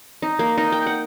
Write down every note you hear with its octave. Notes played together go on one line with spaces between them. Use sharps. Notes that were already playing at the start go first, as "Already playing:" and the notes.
D#4
A#3
D#4
G5
F#5